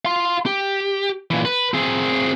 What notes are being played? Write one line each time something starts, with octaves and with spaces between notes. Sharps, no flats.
F5 C6
G4
A#2 E3
B4
C4 G#4